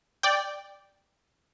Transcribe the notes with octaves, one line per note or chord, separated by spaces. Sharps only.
D5 G5